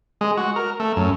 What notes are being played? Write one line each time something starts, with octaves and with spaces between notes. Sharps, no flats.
G#3
F#4
A#4
A3
F#2